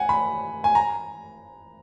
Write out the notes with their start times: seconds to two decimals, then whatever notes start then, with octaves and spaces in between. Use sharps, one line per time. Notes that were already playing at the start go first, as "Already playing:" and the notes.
Already playing: F#5 G#5
0.09 B5
0.64 G#5
0.75 A#5